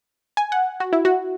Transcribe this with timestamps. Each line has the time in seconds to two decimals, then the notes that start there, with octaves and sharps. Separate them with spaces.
0.37 G#5
0.52 F#5
0.80 F#4
0.93 E4
1.05 F#4